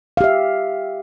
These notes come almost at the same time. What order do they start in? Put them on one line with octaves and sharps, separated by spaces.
F5 G4 E5